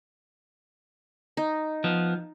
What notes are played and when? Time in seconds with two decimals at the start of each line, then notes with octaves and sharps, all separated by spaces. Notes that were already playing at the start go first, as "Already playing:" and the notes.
1.37 D#4
1.84 F3 B3